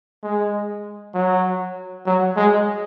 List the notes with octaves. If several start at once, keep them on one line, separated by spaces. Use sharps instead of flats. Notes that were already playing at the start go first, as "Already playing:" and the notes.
G#3
F#3
F#3
G#3